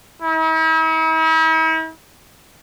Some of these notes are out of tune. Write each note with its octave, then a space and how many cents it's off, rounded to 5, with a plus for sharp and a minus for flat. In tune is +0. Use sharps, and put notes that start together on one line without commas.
E4 -45